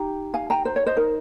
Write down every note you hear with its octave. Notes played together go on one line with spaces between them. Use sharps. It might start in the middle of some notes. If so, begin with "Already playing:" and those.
Already playing: D#4 G4 G5 A#5
F5 G#5
G5 A#5
C5
C#5
C5 D#5
D#4 A#4